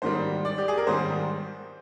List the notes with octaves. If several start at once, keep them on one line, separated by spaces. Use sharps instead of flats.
G#2 D#3 G3 C5
D5
G4
G#4
A#4
G#2 D#3 G3 C5